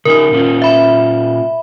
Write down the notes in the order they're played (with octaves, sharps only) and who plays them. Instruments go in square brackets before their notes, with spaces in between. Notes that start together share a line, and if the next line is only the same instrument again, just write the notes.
[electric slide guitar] C#3 D#4 G#5 [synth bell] A#4
[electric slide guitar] A#2 C#4 F4
[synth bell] E5 B5